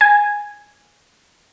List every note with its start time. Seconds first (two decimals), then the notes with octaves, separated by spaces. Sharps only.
0.01 G#5